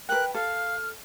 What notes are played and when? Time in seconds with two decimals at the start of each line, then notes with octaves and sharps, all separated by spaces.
0.09 A#4 B4 G5 F#6
0.35 A4 F5 F6